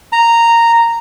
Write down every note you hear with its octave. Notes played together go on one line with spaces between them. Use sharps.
A#5